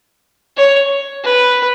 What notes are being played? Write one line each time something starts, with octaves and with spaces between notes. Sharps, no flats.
C#5
B4